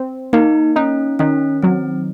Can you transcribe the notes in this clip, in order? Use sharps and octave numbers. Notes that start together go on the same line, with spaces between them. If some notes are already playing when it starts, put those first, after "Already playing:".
Already playing: C4
A#3 D#4
C#4 D#4
D#3 C#4
F#3 C4